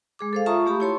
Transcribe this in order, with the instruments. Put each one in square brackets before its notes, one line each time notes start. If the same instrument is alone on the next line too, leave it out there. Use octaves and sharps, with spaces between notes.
[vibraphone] G#3 G#4 D6
A4 C5 F5
F4 E5 A5 A#5 C#6 D#6
A3 G4 A5 B5
E4 C#5 C6 C#6